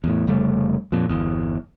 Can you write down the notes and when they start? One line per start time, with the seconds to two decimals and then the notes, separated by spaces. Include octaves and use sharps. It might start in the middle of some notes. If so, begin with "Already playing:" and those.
0.04 E2 A2
0.27 F1 C#3 G3 A3
0.92 F2 A#2
1.09 G1 E2